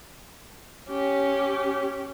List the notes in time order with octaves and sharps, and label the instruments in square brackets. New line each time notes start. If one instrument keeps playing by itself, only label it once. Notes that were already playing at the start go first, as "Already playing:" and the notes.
[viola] C#4 G4